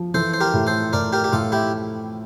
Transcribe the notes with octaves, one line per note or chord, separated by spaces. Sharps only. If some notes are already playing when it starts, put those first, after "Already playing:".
Already playing: F3
E3 A4 C5
C5
G4 A#4
A2
A4 C5
A2 A#4 D5
G4 A#4
G4
A2 F4 A4
E4 G4